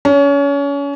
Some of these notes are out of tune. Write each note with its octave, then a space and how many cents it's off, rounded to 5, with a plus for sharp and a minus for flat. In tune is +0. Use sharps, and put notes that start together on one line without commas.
C#4 +30